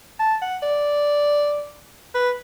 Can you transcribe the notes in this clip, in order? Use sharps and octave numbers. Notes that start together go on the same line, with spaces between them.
A5
F#5
D5
B4